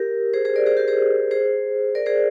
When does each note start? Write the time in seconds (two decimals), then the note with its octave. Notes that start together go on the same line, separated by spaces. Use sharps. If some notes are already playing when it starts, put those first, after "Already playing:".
Already playing: G4 A#4
0.34 G#4 C5
0.45 G#4 C5
0.56 A#4 D5
0.66 G#4 C5
0.77 G4 A#4
0.88 G#4 C5
1.31 G#4 C5
1.95 A#4 D5
2.06 G#4 C5